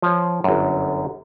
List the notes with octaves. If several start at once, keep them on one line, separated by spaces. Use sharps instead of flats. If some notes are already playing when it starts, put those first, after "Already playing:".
F3 C#5
G1 F#2